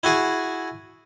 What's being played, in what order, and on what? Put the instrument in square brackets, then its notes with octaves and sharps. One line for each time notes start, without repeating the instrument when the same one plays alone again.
[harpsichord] E4 F#4 G#4